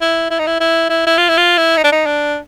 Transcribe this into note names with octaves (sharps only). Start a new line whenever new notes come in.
E4
E4
D#4
E4
E4
E4
E4
F4
E4
F4
E4
D#4
D4
D#4
D4